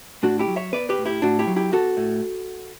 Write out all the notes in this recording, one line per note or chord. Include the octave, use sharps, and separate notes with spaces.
A2 D4 F#4
E4 G4
F#3
C#5 E5
B3 B4 D5
G4 B4
A2
E4 G4
A2 D4 F#4
E4 G4
F#3
E4 G4
B3 F#4 A4
A2